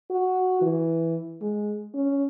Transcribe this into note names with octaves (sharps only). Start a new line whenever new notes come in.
F#4
E3
G#3
C#4